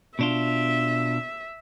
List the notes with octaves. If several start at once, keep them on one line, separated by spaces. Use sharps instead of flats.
B2 D4 F4 E5